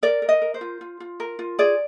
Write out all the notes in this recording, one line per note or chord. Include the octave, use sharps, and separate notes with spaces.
A#4 D5
A#4
D#5
A#4
C5
F4
F4
F4
A#4
F4
G#4 D5